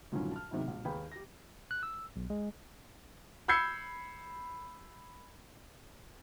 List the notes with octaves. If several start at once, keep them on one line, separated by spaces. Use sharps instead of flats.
D2 G2 A#2 D#3 F#3 C#4
A5 F6
G#2 C3 D#3 F#3 E4
E1 A#1
D#2 G#4 B4 G5 B5
G4 A#6
F#6
E6
B1
G#3
B5 E6 G6 G#6 C7 C#7